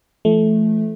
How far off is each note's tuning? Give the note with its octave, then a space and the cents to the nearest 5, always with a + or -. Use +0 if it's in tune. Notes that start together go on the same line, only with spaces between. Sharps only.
E3 +45 A3 -15